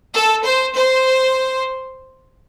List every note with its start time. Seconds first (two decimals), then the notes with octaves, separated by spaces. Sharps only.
0.14 A4
0.44 C5
0.75 C5